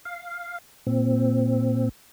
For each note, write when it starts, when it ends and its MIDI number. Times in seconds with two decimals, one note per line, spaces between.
0.05 0.58 77
0.87 1.89 46
0.87 1.89 60